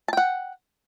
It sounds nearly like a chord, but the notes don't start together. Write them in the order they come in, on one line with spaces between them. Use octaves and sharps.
A5 G5 F#5